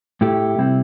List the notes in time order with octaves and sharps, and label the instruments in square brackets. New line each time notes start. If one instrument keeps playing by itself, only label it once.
[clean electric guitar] A2 A3 E4 G4
C3 G3 C4 E4